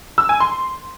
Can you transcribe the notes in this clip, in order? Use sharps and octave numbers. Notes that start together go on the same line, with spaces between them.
E6
G#5
C6